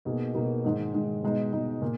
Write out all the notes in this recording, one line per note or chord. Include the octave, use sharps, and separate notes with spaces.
B2 A#3 D#4 G#4
B2 A#3 D#4 G#4
G#2 D#3 G#3
G#2 D#3 G#3
B2 G#3 D#4
B2 G#3 D#4
A#2